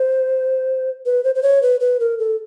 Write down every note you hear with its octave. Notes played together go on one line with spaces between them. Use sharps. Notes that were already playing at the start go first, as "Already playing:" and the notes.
Already playing: C5
B4
C5
C5
C#5
B4
B4
A#4
A4